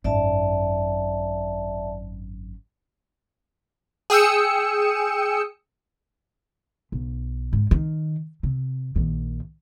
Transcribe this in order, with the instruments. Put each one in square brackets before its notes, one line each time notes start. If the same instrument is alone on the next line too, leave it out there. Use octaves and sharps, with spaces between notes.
[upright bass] G#1 F#2 [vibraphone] D5 E5 A5
[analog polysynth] G#4 G5 D#6 E6 C#7
[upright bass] B1
G#2
D#3
C3
A#1 D#3